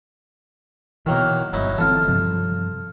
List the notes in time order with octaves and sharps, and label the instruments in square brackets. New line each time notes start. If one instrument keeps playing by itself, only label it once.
[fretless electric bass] B2 E3 [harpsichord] D#3 F#3 A#3
[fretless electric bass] G1 [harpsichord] F#3 D#4 E4
[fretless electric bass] E3 A#3 C4 [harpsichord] F4 A4
[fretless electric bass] G2 C3 F3